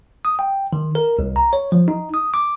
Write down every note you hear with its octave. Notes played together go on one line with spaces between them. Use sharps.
D#6
G5
D#3
A#4
C2
A#5
C#5
F3
D#4
D#6
D6